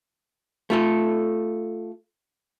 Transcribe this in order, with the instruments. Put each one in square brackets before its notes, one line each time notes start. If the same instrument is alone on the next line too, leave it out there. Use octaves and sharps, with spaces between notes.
[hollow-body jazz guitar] A3 F4 A4